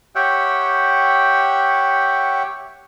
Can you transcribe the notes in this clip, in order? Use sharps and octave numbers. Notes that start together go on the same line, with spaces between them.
G4 C#5 E5 F#5 G5